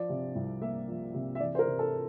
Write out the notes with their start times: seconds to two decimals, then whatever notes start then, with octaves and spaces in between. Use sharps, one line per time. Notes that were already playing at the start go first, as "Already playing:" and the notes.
Already playing: F3 D5
0.09 C3
0.35 C2
0.61 A#3 E5
0.88 F3
1.13 C3
1.35 E5
1.39 E3 D5
1.55 C5
1.59 A#4
1.66 C3
1.79 A4